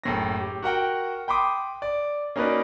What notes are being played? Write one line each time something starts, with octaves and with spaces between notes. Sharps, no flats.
F#1 A2 A#6
G4
F#4 A#4 F#5 G5
G5 B5 C6 D6 D#6
D5
A#3 C#4 D#4 F#4 B4 D5